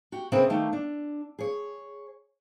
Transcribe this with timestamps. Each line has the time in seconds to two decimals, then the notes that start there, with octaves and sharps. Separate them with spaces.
0.12 F#4 G4
0.32 C3 C4 C#4 G#4 A#4 B4
0.50 D#3 A3 A#3
0.73 D4
1.39 G#4 C#5